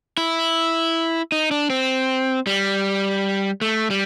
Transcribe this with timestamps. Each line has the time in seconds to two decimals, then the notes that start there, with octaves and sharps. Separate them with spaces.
0.17 E4
1.32 D#4
1.51 D4
1.70 C4
2.47 G3
3.61 A3
3.90 G3